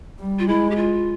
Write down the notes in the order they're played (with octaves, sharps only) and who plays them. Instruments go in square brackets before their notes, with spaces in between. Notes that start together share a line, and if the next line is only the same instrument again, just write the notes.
[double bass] G3
[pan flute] F4
[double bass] G#3 [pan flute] E4
[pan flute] G4
F4